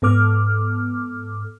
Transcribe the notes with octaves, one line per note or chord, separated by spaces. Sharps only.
G#2 B3 A4 D6 F6